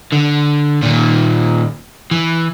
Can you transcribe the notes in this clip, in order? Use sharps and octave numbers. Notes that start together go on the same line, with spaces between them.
D3
A#2 D#3
E3